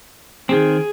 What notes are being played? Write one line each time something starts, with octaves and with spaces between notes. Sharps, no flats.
D#3 C4 G#4